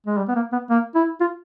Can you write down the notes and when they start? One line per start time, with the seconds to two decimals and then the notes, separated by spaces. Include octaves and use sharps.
0.06 G#3
0.18 G3
0.28 B3
0.36 A#3
0.52 B3
0.70 A#3
0.95 E4
1.20 F4